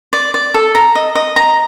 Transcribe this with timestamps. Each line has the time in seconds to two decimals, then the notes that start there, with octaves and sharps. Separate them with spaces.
0.13 D5
0.34 D5
0.54 A4
0.75 A#5
0.95 D#5
1.15 D#5
1.36 A#5